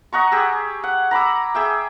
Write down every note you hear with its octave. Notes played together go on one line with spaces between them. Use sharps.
D#5 F#5 A#5 C#6
G4 G#4 E6
F#5
A#5 B5 D6 E6
G#4 E5 G5